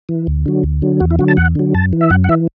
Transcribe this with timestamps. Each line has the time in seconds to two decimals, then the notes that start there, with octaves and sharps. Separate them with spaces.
0.09 E3
0.27 D2
0.46 D3 F#3
0.63 D2
0.82 D3 F#3
1.00 E2 F#4
1.11 E4
1.19 D3 F#3 F#4
1.28 A5
1.37 E2 F#5
1.55 D3 F#3
1.74 F#2 A5
1.93 E3
2.01 E5
2.10 F#2 F#5
2.24 F#5
2.29 E3 E5